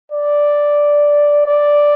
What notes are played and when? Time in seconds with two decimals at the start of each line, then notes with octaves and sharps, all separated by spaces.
0.12 D5
1.45 D5